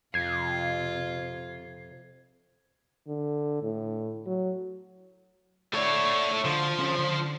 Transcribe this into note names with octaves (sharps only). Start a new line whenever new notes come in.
F2 C3 F4 G#6 C7
D3
A2
F#3
A3 A4 C#5 D5
D3 F3
D3 C#4
D3